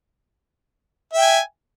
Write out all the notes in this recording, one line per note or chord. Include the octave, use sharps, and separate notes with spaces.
E5 G5 G#5